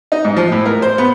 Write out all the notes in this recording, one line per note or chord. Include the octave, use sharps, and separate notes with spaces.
D#4
G#2
F3
A2
A#4
C5
B3